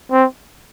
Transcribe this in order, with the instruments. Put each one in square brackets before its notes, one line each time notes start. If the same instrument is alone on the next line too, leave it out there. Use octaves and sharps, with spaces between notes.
[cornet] C4